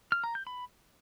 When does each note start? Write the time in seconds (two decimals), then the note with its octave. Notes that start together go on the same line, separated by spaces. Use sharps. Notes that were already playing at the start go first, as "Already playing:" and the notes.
0.12 F6
0.24 A#5
0.35 G6
0.47 B5